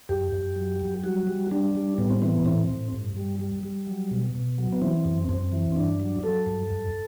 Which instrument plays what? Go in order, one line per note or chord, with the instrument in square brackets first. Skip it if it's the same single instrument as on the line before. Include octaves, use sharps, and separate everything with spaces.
[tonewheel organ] F#2 G4
F#2
F#3
F#3
G3 F#4
G3
G3 D4
G3
A2 B3
C4
E3 B3
A2 C4
A2
G2
G3
G3
G3
F#3
B2
B2
F#3
B3
E3 C4
F#2
F#2 C4
E3
G2 D4
F#3
F#3 A4
G2
F#2